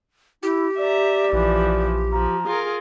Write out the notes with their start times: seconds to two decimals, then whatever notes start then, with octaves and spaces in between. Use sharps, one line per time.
0.43 E4 G4
0.78 D5 E5 A#5
1.33 A#1 E3 F3
2.12 F3 A#5
2.46 F4 G#4 A#4